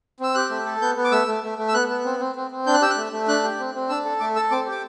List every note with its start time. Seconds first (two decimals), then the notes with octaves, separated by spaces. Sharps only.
0.20 C4 E6
0.35 G4 F#6
0.50 A3
0.65 A4
0.81 B3 G6
0.97 B3
1.04 D6
1.12 A3 E6
1.27 A3
1.43 A3
1.58 A3
1.68 E6
1.74 B3 F#6
1.89 B3
2.05 C4
2.20 C4
2.36 C4
2.51 C4
2.67 D4 G6
2.74 F#6
2.82 G4 E6
2.90 F#6
2.97 A3
3.12 A3
3.28 D4 F#6
3.44 G4
3.59 C4
3.75 C4
3.89 D4 E6
4.05 A4
4.20 A3 D6
4.36 A4 E6
4.51 C4 D6
4.67 G4 D6